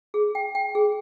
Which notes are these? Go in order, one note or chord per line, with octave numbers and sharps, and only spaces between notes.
G#4
G5
G5
G#4